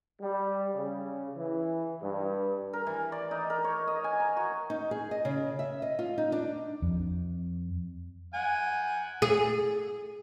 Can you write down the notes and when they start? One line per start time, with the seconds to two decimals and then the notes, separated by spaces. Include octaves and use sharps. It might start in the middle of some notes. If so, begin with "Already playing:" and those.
0.22 G3
0.75 C#3
1.37 E3
2.02 G2
2.73 A#4
2.87 E3
3.12 D5
3.31 D#4
3.50 A#4
3.64 C#5
3.87 D#5
4.04 G#5
4.20 A#5
4.36 F#4
4.70 D#4
4.91 G#4
5.11 D#5
5.25 C#3
5.59 E5
5.82 D#5
5.99 F4
6.18 D#4
6.32 D4
6.82 F2
8.34 F#5 G#5
9.22 G#4